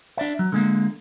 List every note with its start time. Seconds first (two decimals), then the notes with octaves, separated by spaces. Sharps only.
0.17 D4 D5 E5
0.39 F#3
0.52 D3 G#3 A#3